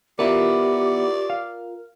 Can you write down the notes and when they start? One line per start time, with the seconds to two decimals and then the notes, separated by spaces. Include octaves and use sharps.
0.19 B3 E4 F4 G4 A#4 D5
1.30 F5